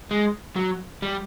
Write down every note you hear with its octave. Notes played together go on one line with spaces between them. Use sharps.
G#3
F#3
G3